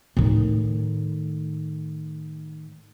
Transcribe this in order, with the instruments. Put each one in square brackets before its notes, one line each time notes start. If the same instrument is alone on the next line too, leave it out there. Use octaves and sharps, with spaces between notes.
[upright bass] A2 D#3